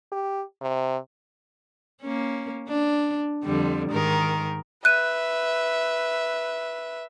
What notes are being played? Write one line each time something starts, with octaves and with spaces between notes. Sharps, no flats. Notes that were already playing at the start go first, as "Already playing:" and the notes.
G4
C3
A#3 C#4
D4
F2 D3 G3
G#2 D#3 A#4
B4 E5 F#6 D#7